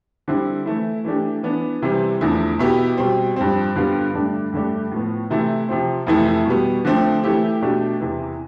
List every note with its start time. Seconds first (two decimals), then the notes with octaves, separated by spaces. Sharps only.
0.28 D3 G3 C4 E4
0.66 E3 A3 E4
1.05 E3 A3 D4 G4
1.43 E3 B3 D4
1.82 C3 E3 G3 C4
2.21 E2 D3 F3 A3 E4
2.59 B2 B3 E4 G4
2.97 B2 G3 C4
3.36 G2 F3 C4
3.76 G2 D3 G3 B3 F4
4.14 G2 D3 A3 D4
4.53 G2 D3 A3 D4 G4
4.91 A2 F3 B3
5.30 C3 E3 A3 E4
5.69 C3 F3 C4
6.07 F2 C3 E3 A3 E4
6.45 B2 G3 B3
6.85 D3 F3 A3 C4
7.23 E3 A3 E4 G4
7.61 B2 A3 D4 G4
8.01 E2 C3 E3